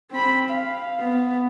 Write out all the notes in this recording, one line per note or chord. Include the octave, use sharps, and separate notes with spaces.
C4 B5
F5
B3